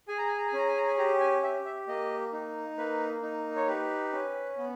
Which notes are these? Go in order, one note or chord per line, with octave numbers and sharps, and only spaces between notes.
G#4 G#5
A#5
G#5
A#5
G#5
C#4 A#5
G#5
A#5
G#5
G4 A#5
G#5
G4 E5
E5
A#3 D#5
D#4
A#3 B4
D#4
C#5
G4 B4
C#4
B3